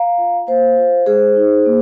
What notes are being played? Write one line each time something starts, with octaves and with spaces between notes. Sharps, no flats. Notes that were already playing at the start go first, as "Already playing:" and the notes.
Already playing: F5 A#5
F4
A#3 C5 F5
F4
G#3 G#4 C5
D#4
A#3